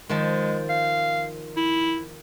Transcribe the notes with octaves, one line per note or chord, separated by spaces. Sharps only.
D#3 F3 G#3 A5
F5
E4